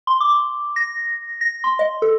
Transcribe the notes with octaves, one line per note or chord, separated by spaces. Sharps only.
C6
D6
A#6
A#6
C6
D#5
A4